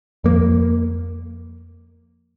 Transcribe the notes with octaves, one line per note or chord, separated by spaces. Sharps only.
F2 A#3